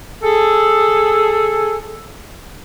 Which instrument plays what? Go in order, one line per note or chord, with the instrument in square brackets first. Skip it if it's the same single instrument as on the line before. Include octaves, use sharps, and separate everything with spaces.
[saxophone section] G#4 A4